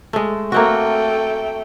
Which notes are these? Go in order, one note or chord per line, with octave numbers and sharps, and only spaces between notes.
G#3 A3
A3 A#3 C4 F#4 G5